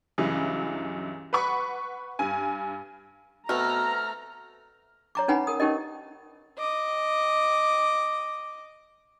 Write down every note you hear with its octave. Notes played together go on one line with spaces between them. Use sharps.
C#2 G2 E3 F#3
B4 F#5 B5 C#6
G2 G#5
B2 A3 C4 A#5 F6
C#5 A#5 D6
C#4 D#4 B4 F#5 G#5 B5
A#4 D#6
C#4 D#4 G4 A#4 D#5
D#5 D6